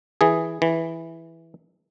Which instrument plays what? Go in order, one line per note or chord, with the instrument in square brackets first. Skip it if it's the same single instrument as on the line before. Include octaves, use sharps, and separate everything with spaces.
[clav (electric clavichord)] E3 G#4
E3